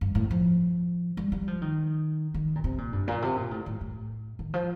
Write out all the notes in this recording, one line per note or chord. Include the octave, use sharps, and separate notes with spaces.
G2
A2
F3
G3
G3
F3
D#3
D#3
A#2
C3
A#2
G2
A#2
C3
A#2
A2
A2
A2
D#3
F3